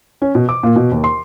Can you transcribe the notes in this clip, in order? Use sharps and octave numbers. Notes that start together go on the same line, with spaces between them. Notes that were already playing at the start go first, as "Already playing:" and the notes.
C#4
B2
D6
A#2
B2
D#2
C6